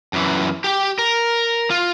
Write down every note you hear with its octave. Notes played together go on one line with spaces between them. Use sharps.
F#2 E3
G4 G5
A#4
F4